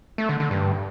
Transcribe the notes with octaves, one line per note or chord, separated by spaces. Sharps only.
A3
D3
D3
G2